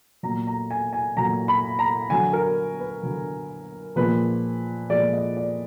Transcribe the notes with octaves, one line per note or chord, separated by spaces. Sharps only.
A#2 F#3 A#5
A#5
G#5
G#5
A#2 F#3 A#5
B5
A#5
D3 F#3 G#5
A#4
B4
D3 F#3
A#2 F3 G#3 B4
A#2 F3 G#3 D5
D#5
D5